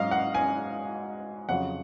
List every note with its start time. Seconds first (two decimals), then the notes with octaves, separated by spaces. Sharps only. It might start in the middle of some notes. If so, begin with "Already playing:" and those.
Already playing: G#2 F#3 D#5 F5
0.11 F#5
0.34 G#5
1.49 F2 C#3 F#3 F#5